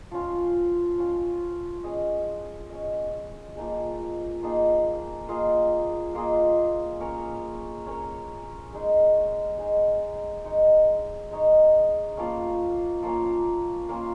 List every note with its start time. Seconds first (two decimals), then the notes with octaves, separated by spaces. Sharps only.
0.11 F3 C#4 F4
0.98 F3 C#4 F4
1.84 C#4 G#4 D#5
2.70 C#4 G#4 D#5
3.56 F3 A#3 D#4 G#4
4.42 F3 A#3 D#4 G#4
5.28 A#3 F4 G#4 D#5
6.15 A#3 F4 G#4 D#5
7.00 C#4 A#4 C#5
7.87 C#4 A#4 C#5
8.73 G#3 D#4 G#4
9.59 G#3 D#4 G#4
10.44 G#3 D#4 C#5
11.31 G#3 D#4 C#5
12.17 F3 A#3 C#4
13.03 F3 A#3 C#4
13.89 A#3 C#4 F4